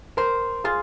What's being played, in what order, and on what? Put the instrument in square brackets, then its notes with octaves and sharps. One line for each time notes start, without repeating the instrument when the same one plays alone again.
[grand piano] A#4 [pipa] C5
[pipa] F4 [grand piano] G#4